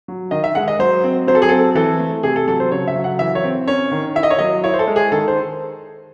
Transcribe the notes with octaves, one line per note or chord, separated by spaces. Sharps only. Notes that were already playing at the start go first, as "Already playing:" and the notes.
F#3
D#3 D#5
E5
G#3 F#5
D#5
F#3 C5
C4
F#3 C5
A4
G#4
C4 A4
E3 A4
A3
C3 G#4
A4
F#3 A4
C5
C#3 C#5
E5
F#3
F#5
E3 E5
C#5
C4
C#4 C#5
D#3
E4 E5
D#5
C#5
F#3 D#5
E4 C#5
C5
A4
G#3
G#4
D#3 A4
C5